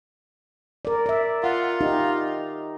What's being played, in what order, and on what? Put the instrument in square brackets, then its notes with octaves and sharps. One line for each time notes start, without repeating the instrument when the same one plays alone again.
[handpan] A#4 D5
D5 E5
[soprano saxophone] F4 [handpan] F#5
[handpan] D#4 G4